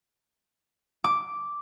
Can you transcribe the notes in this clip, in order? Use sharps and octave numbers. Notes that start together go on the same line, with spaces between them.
D6